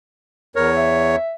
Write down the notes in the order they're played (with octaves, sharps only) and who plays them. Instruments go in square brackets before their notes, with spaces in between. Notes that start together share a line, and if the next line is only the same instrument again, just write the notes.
[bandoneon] E2 C#5 [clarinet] A#4
[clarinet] E5